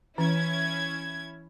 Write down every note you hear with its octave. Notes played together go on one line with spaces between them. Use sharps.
E3 C#4 E4 G#6